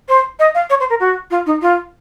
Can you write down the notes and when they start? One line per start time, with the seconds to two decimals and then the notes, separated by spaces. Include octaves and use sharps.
0.08 C5
0.39 D#5
0.55 F5
0.70 C#5
0.80 C5
0.90 A#4
1.00 F#4
1.30 F4
1.46 D#4
1.62 F4